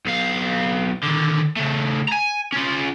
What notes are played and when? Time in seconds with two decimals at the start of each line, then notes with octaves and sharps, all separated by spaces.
0.06 B1 F5
1.03 D3 D#3
1.56 C#3 A3
2.09 G#5 A#5
2.52 C#4 F4